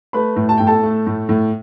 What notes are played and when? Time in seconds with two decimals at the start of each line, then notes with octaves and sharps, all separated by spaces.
0.13 A3 B4 B5
0.36 A2
0.49 A5
0.58 A2 G5
0.67 A4 A5
0.83 A3
1.07 A2
1.29 A2